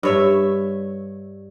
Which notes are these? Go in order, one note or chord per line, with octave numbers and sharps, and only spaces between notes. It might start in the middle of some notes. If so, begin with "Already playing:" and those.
G2 C#5 E5